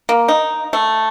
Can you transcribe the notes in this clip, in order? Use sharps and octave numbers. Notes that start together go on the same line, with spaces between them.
A#3
D#4
A3